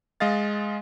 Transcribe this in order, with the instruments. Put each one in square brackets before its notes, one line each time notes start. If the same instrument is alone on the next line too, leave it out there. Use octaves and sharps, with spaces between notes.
[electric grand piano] G#3 D#5 F5 A6